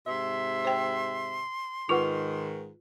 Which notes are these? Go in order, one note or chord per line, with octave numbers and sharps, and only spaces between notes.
G#2 C3 E5 C6
C5 G5
G#2 D#3 F4 B4 F#5 C#6 F7